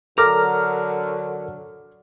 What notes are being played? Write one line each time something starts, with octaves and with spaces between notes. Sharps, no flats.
D3 F#3 A4 A#4 A#5 D6 F6